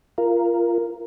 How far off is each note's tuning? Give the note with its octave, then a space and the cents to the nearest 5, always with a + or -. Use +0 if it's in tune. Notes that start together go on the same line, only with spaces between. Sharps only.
F4 -20 A#4 +0